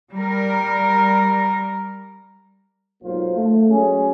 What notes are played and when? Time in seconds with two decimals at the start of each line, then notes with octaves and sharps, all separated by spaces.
0.12 G3 A#4
3.03 B1 G#2 F#3 A#3 F4 C5
3.36 A3
3.69 F#3 G#3 C#4 G#4